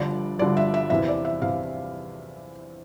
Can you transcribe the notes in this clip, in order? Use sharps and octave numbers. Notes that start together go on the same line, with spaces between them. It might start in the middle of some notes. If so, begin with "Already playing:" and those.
Already playing: G1 G2 D3 F3 D5
G1 G2 D3 F3 D5
E5
E5
E2 C3 E3 E5
D5
E5
C3 E3 F5